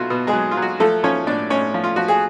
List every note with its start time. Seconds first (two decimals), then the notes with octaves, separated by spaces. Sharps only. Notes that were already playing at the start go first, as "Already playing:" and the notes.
Already playing: B2 F#3 A3 F4 F#4
0.10 B2
0.27 G#3 G#4
0.33 F#3
0.51 F4
0.57 F#3
0.62 F#4
0.80 F3 A3 A4
1.04 F3 C#4 C#5
1.27 A2 D4 D5
1.50 A2 C#4 C#5
1.74 F3
1.84 F4
1.96 F3 F#4
2.08 G#4